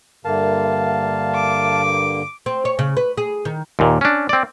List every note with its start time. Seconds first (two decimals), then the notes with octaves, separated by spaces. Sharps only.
0.25 G2 D3 A#3 A#4 E5 F5 A5
1.34 D6
2.46 C4
2.65 C#5
2.79 C#3
2.97 B4
3.17 G#4
3.45 D#3
3.79 D#2 A#2
4.01 C#4 D4
4.29 C4 D5